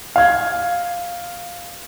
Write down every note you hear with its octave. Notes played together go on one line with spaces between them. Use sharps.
F5 G#6